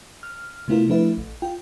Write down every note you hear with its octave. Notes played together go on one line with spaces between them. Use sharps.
F6
C3 A3 B3 E4 F4 A#4
F3 A3 D4 E4 B4 E5
A1
F4 G5